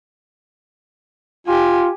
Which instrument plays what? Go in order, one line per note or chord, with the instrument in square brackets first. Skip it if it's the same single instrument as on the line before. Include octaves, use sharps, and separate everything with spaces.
[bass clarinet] F4 [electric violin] G4 G#5